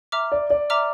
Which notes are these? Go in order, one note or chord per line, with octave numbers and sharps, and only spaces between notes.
E5 A#5 D6 F6
D5
D5
E5 A#5 D6 F6